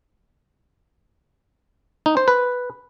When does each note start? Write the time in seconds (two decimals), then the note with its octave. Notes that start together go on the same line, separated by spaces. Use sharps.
2.06 D#4
2.17 C5
2.28 B4